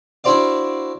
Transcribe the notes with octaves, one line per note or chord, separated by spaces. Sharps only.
D4 E4 F#4 C5 D5 F5